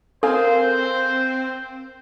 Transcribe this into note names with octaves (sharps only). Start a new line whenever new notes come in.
C4 A4 A#4 C5 F5 G#5